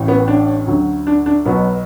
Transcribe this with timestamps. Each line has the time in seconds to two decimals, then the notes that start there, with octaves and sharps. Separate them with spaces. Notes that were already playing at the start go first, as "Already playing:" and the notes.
Already playing: A1 A2 E3
0.08 B3
0.28 D4
0.67 D2 D3 F#3
1.07 D4
1.26 D4
1.45 B1 B2 F#3 B3